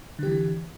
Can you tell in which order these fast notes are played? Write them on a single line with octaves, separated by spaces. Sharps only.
D3 G4 E3